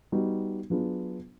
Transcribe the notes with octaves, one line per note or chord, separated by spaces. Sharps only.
G3 B3 D#4 F#4
F#3 B3 D4 F4 G#4